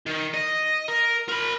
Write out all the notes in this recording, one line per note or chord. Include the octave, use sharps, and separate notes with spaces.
D#3
D#5
A#4
A#4 B5